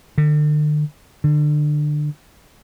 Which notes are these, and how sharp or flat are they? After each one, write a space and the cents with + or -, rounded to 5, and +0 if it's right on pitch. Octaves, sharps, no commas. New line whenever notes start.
D3 +40
D3 +25